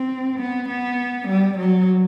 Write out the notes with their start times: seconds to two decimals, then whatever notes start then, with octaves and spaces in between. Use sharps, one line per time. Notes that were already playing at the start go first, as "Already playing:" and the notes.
Already playing: C4
0.39 B3
0.69 B3
1.28 G3
1.58 F#3